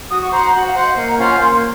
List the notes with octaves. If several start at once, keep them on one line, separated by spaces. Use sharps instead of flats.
F#4 D#6
C#6
C5 F#5 A#5
A#5
F#4 F#5
F5
C5 F#5
D#5
A#3 D#5
A#5
C#4 F4 C5 F5 F#5
G#5
A#3 C6